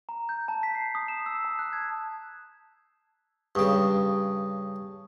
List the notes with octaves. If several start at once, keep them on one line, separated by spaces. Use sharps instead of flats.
A#5
G6
A5
B6
C7
D#6
E7
E6
A5
F#6
G#6
G2 C#3 A5 C#6 D#6